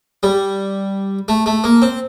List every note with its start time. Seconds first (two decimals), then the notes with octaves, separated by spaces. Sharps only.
0.23 G3
1.28 A3
1.46 A3
1.64 A#3
1.82 C4